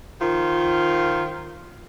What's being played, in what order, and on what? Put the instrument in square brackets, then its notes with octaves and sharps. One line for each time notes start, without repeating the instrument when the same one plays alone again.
[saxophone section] D#3 F3 F4 A#4